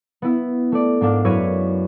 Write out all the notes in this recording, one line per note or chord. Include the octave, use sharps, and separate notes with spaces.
B3 E4
A3 D5
G#2 A#3 D4
F#2 E4 B4 C#5 G#6 D#7